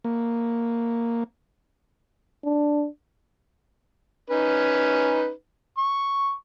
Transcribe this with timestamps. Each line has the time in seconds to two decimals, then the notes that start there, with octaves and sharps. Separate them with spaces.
0.04 A#3
2.45 D4
4.30 C#4 D#4 B4
5.78 C#6